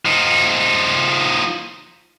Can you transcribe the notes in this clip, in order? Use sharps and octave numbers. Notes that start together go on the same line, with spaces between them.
F3 D#4